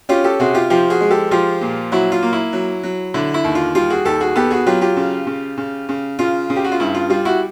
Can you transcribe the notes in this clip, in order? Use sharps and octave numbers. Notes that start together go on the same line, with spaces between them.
C#4 F4 G4
G4 A4
C3 F#4 G#4
F4 G4
F3 F4 G4
F#4 G#4
G#3
G4 A4
F3 F4 G4
A#2
F#3 E4 F#4
F4
A#3
E4
F#3
F#3
D3 E4
E4
D#2
F4
G3 F4
F#4 G#4
D#2 G4 A4
F#4 G#4
B3 G4 A4
F#4 G#4
F#3 F4 G4
F4 G4
C#3
C#3
C#3
C#3
C#3 F4
C#3
G4
F#4
F4
G2 E4
F4
G3 F4
E4 F#4